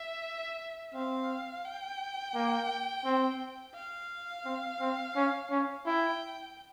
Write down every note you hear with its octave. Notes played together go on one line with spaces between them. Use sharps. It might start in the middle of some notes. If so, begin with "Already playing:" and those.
Already playing: E5
C4 F5
G5
A#3
C4
F5
C4
C4
C#4
C#4
E4 G5